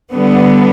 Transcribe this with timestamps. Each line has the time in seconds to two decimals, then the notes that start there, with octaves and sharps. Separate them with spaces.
0.13 D3 G3 B3